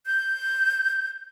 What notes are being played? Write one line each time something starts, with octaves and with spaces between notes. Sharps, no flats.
G6